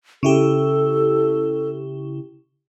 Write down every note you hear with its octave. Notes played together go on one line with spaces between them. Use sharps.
C#3 E4 G4 A4